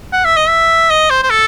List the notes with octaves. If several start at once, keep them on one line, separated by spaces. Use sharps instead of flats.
F#5
E5
D#5
E5
D#5
C5
C5
A4